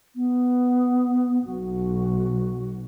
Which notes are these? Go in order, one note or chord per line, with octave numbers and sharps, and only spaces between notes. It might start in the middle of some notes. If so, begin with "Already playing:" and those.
B3
B1 F#4